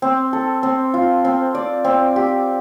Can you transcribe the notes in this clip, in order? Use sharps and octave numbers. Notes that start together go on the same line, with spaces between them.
C4
A4
C4
F4
C4
D5
C4
G4